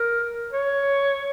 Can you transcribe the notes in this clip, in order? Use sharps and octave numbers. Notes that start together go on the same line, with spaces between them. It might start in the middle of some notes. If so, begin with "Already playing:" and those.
Already playing: A#4
C#5